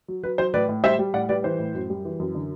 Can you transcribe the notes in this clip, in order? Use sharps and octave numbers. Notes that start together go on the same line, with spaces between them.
F#3
F#3 B4
F#3 C5
A2 B4 D5
A2
G3 C5 E5
G3
A2 D5 F#5
G3 B4 D5
E3 C5
A2
F#2
G3
E3
F#2
D3